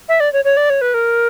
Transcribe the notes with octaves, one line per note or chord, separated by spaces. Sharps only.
E5
D5
C#5
C#5
D5
C#5
B4
A#4